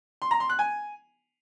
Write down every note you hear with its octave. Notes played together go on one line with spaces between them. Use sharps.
C6
A#5
C6
F#6
G#5